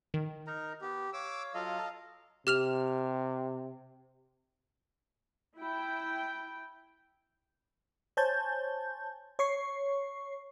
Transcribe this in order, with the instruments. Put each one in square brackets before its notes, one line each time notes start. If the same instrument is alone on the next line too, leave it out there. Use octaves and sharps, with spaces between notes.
[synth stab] D#3
[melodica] D#4 A#4 A#5
[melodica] B3 [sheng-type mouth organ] G4
[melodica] C#5 F5 [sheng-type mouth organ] D6 E6
[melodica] F#3 F4 A4 [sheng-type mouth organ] D#5 F5
[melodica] A4 A5 A#5
[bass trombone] C3 [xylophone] G4 F6 F7
[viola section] E4 G5
[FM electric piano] C5 C#5 G#5 A5 G6
C#5 C#6 C7